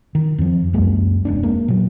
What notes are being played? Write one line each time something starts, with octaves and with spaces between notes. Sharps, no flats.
D#3
F2 F3
C#2 F#2 G#3 A#3
E1 B3 D4
G#3 A#3
A#2 F#3